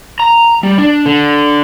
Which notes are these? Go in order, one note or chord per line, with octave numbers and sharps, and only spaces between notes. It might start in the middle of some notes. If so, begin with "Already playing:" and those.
A#5
G3
D4
D3